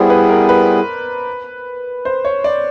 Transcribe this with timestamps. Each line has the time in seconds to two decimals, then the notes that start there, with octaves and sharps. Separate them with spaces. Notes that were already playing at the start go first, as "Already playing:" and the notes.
Already playing: G3 B3 E4 G#4 C5 D5
0.10 B4
0.29 A#4
0.49 B4
2.05 C5
2.25 C#5
2.44 D5